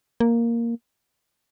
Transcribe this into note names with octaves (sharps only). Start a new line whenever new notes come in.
A#3